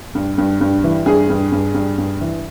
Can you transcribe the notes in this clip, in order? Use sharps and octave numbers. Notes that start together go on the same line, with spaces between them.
G2
G2
G2
E3
G2 G#4
G2
G2
G2
G2
E3